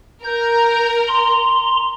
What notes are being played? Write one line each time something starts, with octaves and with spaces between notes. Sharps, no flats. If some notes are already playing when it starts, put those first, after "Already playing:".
A#4 G6
A#5 C6